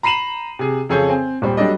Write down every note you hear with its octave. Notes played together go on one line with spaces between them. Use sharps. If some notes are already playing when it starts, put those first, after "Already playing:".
A#5 B5 C7 D#7 E7 F#7
C3 G#4
F2 C#3 G#4 A4 C#5 G6
C4 G#5
D#1 G3 C5
F#3 G3 D4 A4 D5 D#5